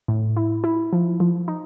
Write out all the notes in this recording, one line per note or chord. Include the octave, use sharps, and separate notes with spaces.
A2
E4
E4
F3
F3
D#4